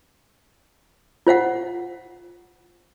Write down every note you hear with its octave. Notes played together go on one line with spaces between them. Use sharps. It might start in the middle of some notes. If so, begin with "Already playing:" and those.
F4 C5 F5 F#5